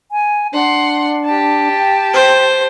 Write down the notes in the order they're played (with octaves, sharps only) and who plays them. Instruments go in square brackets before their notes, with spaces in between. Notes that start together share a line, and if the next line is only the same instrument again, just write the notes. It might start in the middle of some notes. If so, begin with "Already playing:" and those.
[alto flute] G#5
[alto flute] D4 [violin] F#5 C6
[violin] G4 A5
[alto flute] G5
[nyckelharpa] C5